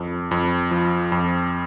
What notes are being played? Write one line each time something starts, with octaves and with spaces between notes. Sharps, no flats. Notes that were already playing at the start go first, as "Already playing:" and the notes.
Already playing: F2
F2
F3
F2